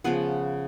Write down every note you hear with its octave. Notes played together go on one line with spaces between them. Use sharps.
C#3 F3 B3 G#4 B4